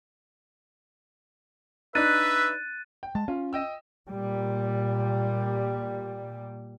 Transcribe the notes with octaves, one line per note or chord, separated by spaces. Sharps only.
D4 D#4 B4 E5 F#6 A6 D#7
G5
G#3 A5
C#4 F4
D#5 G5 E6
A#2 G3